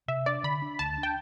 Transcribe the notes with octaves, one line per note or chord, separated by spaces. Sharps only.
C3 E5
D4 D5
D3 B5
D4
D2 A5
D4
G5